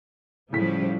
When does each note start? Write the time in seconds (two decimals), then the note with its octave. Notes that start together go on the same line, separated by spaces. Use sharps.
0.53 A2 C#3 F3 G3 B6